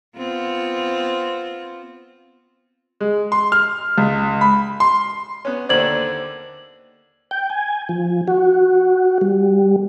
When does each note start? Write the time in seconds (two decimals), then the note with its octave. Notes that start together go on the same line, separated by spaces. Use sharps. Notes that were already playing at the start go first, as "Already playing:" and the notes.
0.17 B3 C4 F4
3.00 G#3
3.32 C6
3.52 F6
3.98 C#2
4.41 B5
4.80 C6
5.45 B3 C#4
5.69 D#2 D3 C5 D5 G#6 F#7
7.31 G5
7.50 G#5
7.89 F3
8.28 F#4
9.21 G3